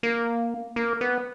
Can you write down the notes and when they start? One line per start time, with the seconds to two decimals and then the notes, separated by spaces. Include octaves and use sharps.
0.03 A#3
0.76 A#3
1.01 B3